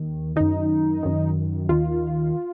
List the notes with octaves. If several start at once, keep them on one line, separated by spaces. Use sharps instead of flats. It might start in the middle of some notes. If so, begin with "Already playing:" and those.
Already playing: D#2 D#3
F#2 D#3 D#4
F#2 D#3
D#2 D#3 F4